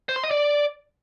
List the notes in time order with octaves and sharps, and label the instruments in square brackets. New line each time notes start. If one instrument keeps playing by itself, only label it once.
[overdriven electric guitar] C5
C6
D#5
D5